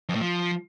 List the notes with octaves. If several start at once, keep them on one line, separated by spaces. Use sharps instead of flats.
F2
A2
F3